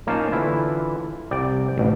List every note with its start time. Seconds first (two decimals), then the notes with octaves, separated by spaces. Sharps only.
0.07 A#2 A#3 C#4 D#4 F5 A5
0.32 D3 E3 E4 F4
1.31 C2 D5 G5
1.78 A1 D2